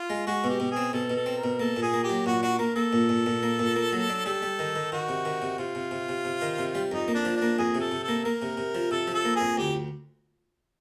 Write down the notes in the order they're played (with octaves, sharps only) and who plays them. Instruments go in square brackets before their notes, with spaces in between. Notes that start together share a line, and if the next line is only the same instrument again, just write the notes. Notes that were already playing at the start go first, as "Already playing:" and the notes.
Already playing: [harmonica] F4
[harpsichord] G#3
[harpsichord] G#3 [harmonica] F#4
[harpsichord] B2
[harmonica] G4
[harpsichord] B2
[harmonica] G#4
[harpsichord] C4
[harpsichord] B2 [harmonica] A4
[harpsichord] B2
[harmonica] A4
[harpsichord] C4
[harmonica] A#4
[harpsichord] B2
[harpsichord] A#3 [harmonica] A4
[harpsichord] A#2
[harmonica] G#4
[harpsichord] A#3
[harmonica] G4
[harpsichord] F#3
[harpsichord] A#2 [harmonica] F#4
[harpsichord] D4 [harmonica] F#4
[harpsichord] A#3 [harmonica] A#4
[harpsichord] A#3 [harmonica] A4
[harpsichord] A#2
A#2
A#2
A#3
A#2
A#3
F#3
D4
[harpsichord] G3 [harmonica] A4
[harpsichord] G3
D#3
D#3
[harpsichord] D#3 [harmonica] F#4
[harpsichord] C3
D#3
C3
[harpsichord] C3 [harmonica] F4
[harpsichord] C3
C3
C3
C3
D#3
C3
G3
[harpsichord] F2 [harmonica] D#4
[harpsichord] A#3
[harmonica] D4
[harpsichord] F3
[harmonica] D4
[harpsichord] A#3
[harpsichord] F2 [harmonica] G#4
[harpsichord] C3
[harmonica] A4
[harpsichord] C3
[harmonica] A4
[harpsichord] A#3
[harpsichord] A#3 [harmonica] A#4
[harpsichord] C3
C3
F3
[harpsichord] C3 [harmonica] A4
[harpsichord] F3
[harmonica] A4
[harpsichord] A#3
[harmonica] G#4
[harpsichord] F2
[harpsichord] D2 [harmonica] G4